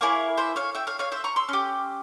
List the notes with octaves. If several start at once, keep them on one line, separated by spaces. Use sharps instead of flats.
A#3 E4 G#4 A#4 C#5
C5 E5
C#5 F5
E5 G5
C#5 F5
C#5 F5
C5 E5
A#5 C#6
C6 E6
C#4 G4